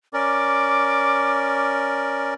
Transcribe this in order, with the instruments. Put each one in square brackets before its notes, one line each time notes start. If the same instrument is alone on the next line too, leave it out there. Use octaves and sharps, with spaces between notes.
[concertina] C#4 A#4 D5 [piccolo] D6